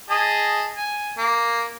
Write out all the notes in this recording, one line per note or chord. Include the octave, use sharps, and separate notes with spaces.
G#4 D#5 A5
G#5
A#3